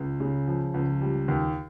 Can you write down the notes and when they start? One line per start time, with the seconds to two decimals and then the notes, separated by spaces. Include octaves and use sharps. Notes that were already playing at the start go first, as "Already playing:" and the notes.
Already playing: C#2
0.20 C#3
0.48 F3
0.74 C#2
1.01 G3
1.28 D#2